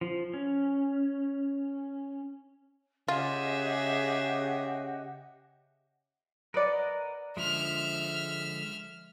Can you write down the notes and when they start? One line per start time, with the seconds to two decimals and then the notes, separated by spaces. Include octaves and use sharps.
0.01 F3
0.33 C#4
3.08 C#3 F4 G4 G#4 D#5 E5 F#5
6.54 A#4 B4 D5 D#5 F#5
7.37 D3 F3 G#3 E5 F6